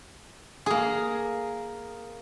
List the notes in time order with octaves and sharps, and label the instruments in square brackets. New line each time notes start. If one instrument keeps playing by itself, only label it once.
[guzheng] A#3 G#4